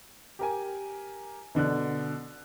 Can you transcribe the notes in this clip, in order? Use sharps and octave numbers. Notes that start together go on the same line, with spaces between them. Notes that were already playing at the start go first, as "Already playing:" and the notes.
G4 A#4 G#5
B2 D3 D5 F#6